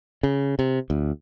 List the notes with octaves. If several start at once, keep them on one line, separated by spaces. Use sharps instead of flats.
C#3
C3
D2